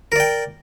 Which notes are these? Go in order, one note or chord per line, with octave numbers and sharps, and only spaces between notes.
A#4 D5 G5